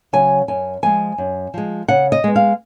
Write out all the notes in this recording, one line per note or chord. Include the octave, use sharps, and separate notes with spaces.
C#3 F#3 G#5
F#2 G#5
F3 G#3 G#5
F#2
F3 G#3
C#3 F#5
D#5
G#3 B3
F5